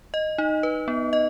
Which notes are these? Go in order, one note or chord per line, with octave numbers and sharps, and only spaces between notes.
D#5
D#4
B4
B3
D#5